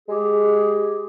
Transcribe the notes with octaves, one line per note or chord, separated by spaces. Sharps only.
G#3 G4 G#4